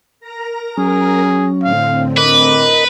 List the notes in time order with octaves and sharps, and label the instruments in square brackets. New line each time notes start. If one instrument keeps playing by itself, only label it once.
[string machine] A#4 A#5 A#6
[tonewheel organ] F#3 C#4 [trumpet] G#4
[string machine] A2 D3 C4 [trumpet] F5
[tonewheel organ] A#4 D#5 [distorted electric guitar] B4 [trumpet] D6